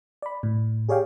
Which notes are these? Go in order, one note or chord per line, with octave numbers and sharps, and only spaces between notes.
D5 B5
A2
G4 G#4 C#5 D5 F5 G5